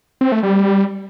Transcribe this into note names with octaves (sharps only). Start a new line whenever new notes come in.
C4
A3
G3